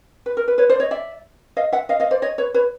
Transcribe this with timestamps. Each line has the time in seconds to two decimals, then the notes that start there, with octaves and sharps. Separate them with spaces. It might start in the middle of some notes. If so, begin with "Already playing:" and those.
0.26 B4
0.37 A#4
0.48 B4
0.58 B4 C#5
0.70 C5 D5
0.80 C#5 D#5
0.91 D5 E5
1.57 D#5 F5
1.72 E5 F#5
1.89 D#5 F5
2.00 D#5 F5
2.11 C5 D5
2.22 C#5 D#5
2.38 B4 C#5
2.54 B4 C#5